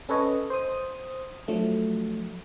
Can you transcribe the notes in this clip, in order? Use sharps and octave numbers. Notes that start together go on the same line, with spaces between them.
C#4 A4 B4 C#5 D#5
C5 D#6
F3 F#3 A3 D4